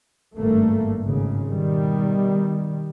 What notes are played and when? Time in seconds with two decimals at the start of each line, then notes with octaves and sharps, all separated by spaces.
0.36 G#1 G2 A3 A#3
1.06 G#1 C#3
1.49 B2 D#3 G3